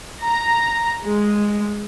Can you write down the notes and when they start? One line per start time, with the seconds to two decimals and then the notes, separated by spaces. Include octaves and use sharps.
0.24 A#5
1.05 G#3